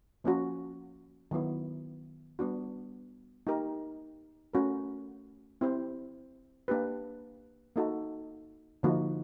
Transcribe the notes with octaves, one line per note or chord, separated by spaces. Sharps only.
F3 A#3 C#4 F#4
D#3 F#3 B3 E4
G3 B3 D4 F#4
A#3 D#4 G4 A#4
A3 C#4 F#4 A#4
C4 E4 G4 C5
A#3 D4 G4 B4
A#3 D#4 F#4 A4
D3 F3 A#3 D#4 F#4